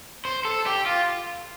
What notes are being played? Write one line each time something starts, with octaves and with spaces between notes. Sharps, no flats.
C5
A4
G4
F4